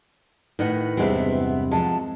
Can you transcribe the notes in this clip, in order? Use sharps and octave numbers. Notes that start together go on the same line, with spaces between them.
A2 D#3 B4 D#5 F#5
E2 G2 C3 G#3 B3 C4 E4
F3 F#3 G#3 A5